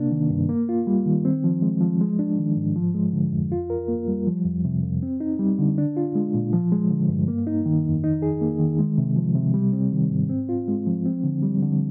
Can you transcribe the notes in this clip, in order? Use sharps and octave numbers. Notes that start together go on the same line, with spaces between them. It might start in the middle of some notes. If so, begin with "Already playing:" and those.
Already playing: C3 A#3 D4
D#3
G2
A#3
F4
G3
D#3
C4
F3
G#3
F3
G#3
D4
D#3
G#2
F3
G#3
D3
F2
F4
A#4
A#3
G3
F3
F2
C3
F2
C4
D#4
G3
D3
D4
F4
G#3
A#2
F3
G#3
D3
G2
A#3
D#4
D#3
F2
D#4
G#4
A#3
D#3
G#3
C3
F3
C3
G3
C4
D#3
G#2
C4
F4
G#3
F3
C4
D3
G3
D3